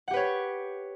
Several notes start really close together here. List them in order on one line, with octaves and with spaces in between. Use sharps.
F#5 G4 B4 C#5